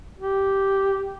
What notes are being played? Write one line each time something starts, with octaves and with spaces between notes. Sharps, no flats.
G4